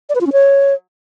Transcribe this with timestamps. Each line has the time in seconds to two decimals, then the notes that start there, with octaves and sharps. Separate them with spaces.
0.09 D5
0.15 B4
0.21 F4
0.27 C#4
0.32 C#5